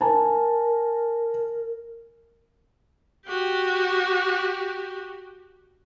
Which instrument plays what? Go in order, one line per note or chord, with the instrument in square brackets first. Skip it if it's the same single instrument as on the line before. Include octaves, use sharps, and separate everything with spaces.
[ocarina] A#4 [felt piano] G#5 A5
[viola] F#4 G4